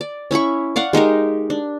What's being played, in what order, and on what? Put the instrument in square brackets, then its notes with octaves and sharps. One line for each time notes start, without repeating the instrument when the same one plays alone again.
[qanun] D5
C#4 E4 B5 C#6
D5 F5 F#5 C#6
G#3 D#4 G4 A#4
D4